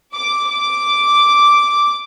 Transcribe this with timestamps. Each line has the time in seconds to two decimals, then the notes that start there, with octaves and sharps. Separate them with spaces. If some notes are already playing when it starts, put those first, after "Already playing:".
0.15 D6
0.48 D6